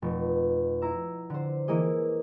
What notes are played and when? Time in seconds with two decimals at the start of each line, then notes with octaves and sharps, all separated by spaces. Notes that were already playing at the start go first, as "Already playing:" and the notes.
0.02 F1 B2
0.82 E4 A#5 E6
1.30 D3 C5
1.68 E3 A#3 E4 G#4 D#5